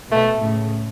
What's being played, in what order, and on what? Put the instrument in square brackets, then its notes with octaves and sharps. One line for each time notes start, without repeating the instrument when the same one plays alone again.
[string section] B2 [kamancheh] A3
[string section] A2 C#3